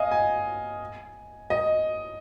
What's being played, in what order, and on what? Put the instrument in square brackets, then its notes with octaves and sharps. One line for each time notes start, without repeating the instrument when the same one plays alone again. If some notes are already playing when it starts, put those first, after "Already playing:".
Already playing: [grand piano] D#5 F5 G#5
G#5
D#5